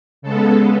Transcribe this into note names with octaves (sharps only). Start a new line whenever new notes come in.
C#3 G#3 B3 A4